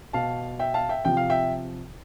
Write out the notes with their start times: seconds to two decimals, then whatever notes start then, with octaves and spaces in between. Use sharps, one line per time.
0.13 B2 F5 A5
0.59 E5 G5
0.74 F5 A5
0.89 E5 G5
1.05 C3 F3 G5
1.17 F5
1.30 E5 G5